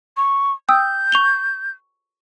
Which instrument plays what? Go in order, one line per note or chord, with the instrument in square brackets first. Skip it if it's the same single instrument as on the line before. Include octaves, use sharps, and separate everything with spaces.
[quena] C#6
[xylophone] G5 D#6 E6 [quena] G6
[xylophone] C#6 F7 G7